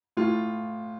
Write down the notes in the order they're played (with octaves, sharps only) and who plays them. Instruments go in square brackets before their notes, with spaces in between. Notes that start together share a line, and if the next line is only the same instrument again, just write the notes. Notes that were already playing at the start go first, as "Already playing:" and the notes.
[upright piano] A2 F4